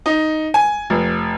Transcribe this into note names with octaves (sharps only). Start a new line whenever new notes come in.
D#4
G#5
F1